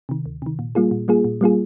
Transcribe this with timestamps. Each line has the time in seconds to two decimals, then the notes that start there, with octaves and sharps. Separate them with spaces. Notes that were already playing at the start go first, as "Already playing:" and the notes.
0.09 C3 D#3
0.26 D2
0.42 C3 D#3
0.59 A#2
0.75 G3 A#3 F4 G#4
0.91 A#2
1.08 G3 A#3 F4 G#4
1.24 A#2
1.41 G3 A#3 F4 G#4